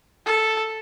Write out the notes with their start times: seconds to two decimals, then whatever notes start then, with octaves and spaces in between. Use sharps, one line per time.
0.26 A4